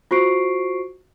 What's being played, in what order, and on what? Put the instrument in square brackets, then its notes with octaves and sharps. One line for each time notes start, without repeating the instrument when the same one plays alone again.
[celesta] F4 F#4 C5 C#6 C7 D7